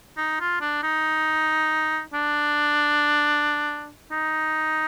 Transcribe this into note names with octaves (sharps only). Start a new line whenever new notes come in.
D#4
F4
D4
D#4
D4
D#4